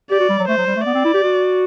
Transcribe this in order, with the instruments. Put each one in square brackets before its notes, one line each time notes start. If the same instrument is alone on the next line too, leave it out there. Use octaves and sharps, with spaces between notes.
[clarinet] G4 [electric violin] D5
[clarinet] F#4
G3
F#3
[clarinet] A3 [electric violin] C5
[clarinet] F#3
G3
A3
[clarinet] B3 [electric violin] D5
[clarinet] C4
E4
G4
F#4